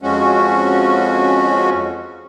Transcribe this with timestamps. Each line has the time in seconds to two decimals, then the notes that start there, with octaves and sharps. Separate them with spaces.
0.02 F2 F3 G#3 C#4 F#4